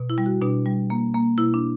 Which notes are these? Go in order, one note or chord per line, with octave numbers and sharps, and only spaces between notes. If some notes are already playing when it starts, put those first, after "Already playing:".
Already playing: B2
E4
G3
F#4
B2 D4
G3
A#3
A#3
B2 E4
D4